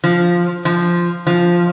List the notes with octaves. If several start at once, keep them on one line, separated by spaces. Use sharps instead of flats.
F3
F3
F3